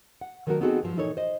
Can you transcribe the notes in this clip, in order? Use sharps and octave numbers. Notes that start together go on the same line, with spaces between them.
F#5
D#3 F#3 A3 D4 F#4 A#4
B3 C4 D#4 F#4 G#4 A4
G2 F3 F#3
A#2 E3 D#4 A4 B4 C#5
C5 D#5